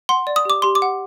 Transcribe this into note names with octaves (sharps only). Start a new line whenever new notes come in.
F#5 C6
D5
D#6
G4 D6
G4 C6
D6
F#5